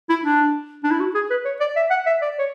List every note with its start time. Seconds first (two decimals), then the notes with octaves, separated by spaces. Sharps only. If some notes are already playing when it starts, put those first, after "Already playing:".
0.09 E4
0.24 D4
0.84 D4
0.91 E4
1.00 F#4
1.14 G#4
1.30 B4
1.45 C#5
1.60 D5
1.76 E5
1.90 F#5
2.06 E5
2.22 D5
2.39 C#5